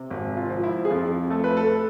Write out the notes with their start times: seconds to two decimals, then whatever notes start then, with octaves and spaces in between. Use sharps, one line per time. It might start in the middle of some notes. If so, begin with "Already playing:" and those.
Already playing: C3
0.10 G#1
0.37 F4
0.50 F3
0.63 E4
0.85 G#4
0.90 F2 F4
1.30 A3 A4
1.44 B4
1.57 A4